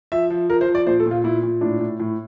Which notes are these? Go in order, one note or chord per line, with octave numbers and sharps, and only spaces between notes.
F3 E5
F3
F3 A#4
C5
F3
D5
A#2 C5
A4
A#2
F4
A#2 E4
A#2
A2 D4
A2
A2